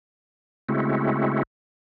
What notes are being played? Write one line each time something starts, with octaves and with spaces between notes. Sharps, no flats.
C#3 G#3 A3 C4 E4 F#4